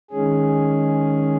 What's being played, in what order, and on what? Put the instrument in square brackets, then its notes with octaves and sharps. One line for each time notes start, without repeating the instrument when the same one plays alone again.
[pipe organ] D#3 G#3 C#4 G#4